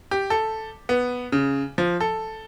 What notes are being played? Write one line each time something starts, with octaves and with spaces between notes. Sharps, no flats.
G4
A4
B3
C#3
F3
A4